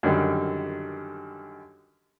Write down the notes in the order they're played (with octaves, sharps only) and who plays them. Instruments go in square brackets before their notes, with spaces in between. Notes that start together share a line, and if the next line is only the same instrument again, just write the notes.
[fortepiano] F#2 D3 D#3 G3